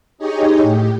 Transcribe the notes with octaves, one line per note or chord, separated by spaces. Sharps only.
D#4 G4 G#4 C#5 D#5
A2 G4